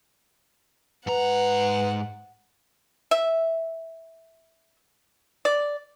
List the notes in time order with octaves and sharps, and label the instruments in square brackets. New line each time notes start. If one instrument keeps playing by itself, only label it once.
[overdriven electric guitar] G#2 A#5 [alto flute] B4 [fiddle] F#5
[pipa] E5
D5